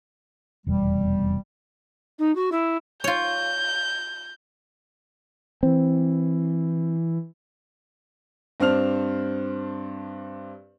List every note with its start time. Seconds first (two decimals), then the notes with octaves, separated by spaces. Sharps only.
0.67 F1 E2 B2 G3
2.19 D#4
2.36 F#4
2.52 E4
3.04 F4 C#5 G6
5.63 E3 C4
8.60 G2 C4 D4 C5 F6 F7